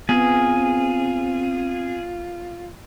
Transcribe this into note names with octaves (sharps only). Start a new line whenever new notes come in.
B3 C4 F4 G#4